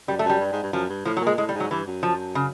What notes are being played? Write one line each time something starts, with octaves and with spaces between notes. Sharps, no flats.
F#2 G3
A3
F#2 G3
G2
G#2
G2
F#2 F3
G2
A2 F3
F#3
A#2
G#3
A2 G#3
G3
G#2
F#3
G2 E3
F#2
F3
C#3